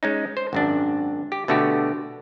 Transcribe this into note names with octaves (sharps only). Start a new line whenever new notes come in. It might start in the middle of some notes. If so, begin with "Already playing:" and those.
G#3 C#4 D#4
C5
G#1 F#2 D4
G4
B2 D3 A3 F#4 G4